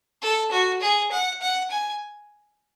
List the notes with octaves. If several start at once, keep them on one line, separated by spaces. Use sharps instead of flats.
A4
F#4
G#4
F#5
F#5
G#5